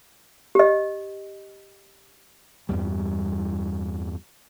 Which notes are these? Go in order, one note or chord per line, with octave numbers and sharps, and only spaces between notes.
G4 D#5
E2 G2 G3